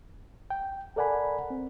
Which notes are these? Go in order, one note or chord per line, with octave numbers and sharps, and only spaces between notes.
G5
A4 A#4 D5 F#5 G#5 B5
C4